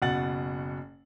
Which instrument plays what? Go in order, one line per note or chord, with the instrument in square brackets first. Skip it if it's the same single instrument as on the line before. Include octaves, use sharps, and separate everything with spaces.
[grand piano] F#1 B2 F#5 A6 F#7